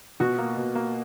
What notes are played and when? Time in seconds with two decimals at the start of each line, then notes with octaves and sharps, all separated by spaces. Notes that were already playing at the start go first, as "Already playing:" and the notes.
0.20 B2 F#4
0.38 A#3
0.57 B2
0.75 A#3